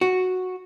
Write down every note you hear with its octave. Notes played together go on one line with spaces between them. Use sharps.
F#4